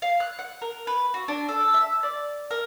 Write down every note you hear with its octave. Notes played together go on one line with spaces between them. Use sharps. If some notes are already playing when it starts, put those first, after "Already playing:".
F5
F#6
F#5
A#4
B4
F#4
D4
A4
E5
D5
A#4